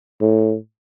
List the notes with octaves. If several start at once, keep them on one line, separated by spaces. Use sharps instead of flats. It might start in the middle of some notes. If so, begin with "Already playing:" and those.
A2